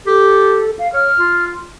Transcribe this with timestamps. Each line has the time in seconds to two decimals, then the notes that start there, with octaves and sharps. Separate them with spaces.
0.07 G4 A4
0.79 F5
0.93 C#5 F6
1.18 F4